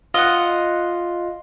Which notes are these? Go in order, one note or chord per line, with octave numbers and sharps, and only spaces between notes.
F4 D#5 F#5